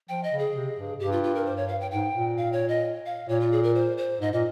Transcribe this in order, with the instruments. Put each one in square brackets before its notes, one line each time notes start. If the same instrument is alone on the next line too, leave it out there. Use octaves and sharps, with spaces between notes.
[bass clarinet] F3 [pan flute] G5
[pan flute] D#5
[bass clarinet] C#3
[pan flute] G#4
[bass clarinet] C3
G2
[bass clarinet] G2 [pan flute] G4
[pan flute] F4
F4
A#4
C5
C#5
F5
G5
[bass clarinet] G#2 [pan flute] G5
[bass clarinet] A#2
[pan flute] F5
C#5
D#5
F5
[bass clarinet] A#2 [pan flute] C#5
[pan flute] F4
G#4
A#4
C5
C5
[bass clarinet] G#2 [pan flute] D#5
[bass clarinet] A#2 [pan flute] D#5